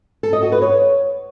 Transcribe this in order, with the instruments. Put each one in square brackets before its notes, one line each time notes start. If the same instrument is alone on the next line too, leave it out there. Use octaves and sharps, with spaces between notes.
[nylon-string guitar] A4
D#5
F#4
B4
C#5